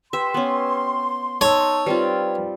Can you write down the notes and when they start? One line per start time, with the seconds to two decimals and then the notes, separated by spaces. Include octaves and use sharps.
0.13 G4 B4 E5 G5 C6
0.34 B3 C#4
1.41 D#4 C#5 A5 C#6 E6
1.86 G3 C4 F4 B4